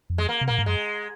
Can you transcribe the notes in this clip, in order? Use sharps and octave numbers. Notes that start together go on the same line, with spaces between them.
F2
G#3
A#3
C3
A#2 A#3
G#2
F#2 G#3